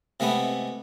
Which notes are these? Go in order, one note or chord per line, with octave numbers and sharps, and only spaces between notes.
C3 G#3 A3 B3